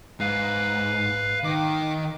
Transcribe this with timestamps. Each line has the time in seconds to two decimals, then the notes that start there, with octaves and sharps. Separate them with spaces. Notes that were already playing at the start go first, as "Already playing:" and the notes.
0.20 G#2 B4 F5
1.44 D#3 D6